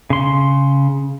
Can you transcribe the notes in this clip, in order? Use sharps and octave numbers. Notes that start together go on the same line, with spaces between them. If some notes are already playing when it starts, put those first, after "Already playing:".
C#3 C6